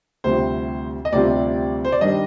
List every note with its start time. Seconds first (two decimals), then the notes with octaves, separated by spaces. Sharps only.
0.24 D2 C3 G3 C4 F4 C5
1.05 D#5
1.12 D2 C3 G3 C4 F4 D5
1.85 C5
1.92 D5
2.01 G2 D#3 G3 D4 D#5